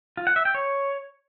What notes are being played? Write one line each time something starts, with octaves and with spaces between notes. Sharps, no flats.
F4
F#5
E5
G5
C#5